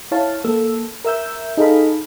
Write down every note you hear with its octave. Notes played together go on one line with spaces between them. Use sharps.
E4 C#5 F5 A5
A#3 A4 E6
A#4 E5 E6 G6
D#4 G#4 A4 D#5 F5 B5